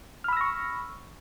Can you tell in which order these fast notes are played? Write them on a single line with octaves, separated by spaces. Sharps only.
F6 B5 E6 A#6 C#6